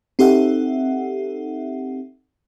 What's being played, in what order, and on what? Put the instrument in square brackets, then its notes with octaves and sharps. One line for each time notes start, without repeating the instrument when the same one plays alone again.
[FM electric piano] C4 D#4 G4 A4 E5 F#5